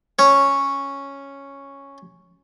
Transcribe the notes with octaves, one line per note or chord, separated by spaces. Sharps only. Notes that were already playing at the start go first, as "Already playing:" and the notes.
C#4 C#5